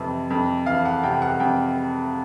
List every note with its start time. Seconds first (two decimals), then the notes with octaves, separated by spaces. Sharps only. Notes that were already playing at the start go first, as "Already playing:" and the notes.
Already playing: F2 C3 E3
0.30 F2
0.66 E3 F5
0.85 F#5
1.03 C3 G5
1.22 F#5
1.40 F2 G5